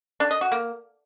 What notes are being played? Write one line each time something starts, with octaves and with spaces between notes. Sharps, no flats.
D4
D#5
F#4
A#3